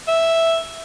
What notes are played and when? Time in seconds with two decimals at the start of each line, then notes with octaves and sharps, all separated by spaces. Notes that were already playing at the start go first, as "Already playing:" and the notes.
0.08 E5